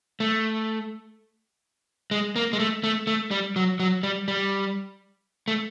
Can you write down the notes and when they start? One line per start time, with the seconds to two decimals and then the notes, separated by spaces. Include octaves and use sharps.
0.20 A3
2.11 G#3
2.36 A#3
2.53 G#3
2.60 A3
2.83 A3
3.07 A3
3.31 G3
3.56 F#3
3.80 F#3
4.03 G3
4.28 G3
5.48 A3